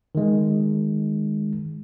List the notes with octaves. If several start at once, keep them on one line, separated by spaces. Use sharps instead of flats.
D#3 G#3